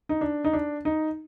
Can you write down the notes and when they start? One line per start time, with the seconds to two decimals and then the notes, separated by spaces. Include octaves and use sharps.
0.09 D#4
0.21 D4
0.44 D#4
0.53 D4
0.85 D#4